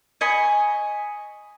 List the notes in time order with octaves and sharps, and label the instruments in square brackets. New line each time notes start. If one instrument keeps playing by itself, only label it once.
[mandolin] D#5 G#5 B5 C#6